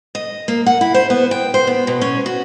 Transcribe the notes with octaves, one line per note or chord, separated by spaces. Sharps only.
D#5
A#3
F#5
E4
C5
B3
G5
C5
B3
B2
C#4
F#4